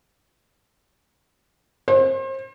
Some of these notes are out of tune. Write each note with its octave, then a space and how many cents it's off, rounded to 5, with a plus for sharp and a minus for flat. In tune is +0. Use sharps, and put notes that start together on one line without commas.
C5 +35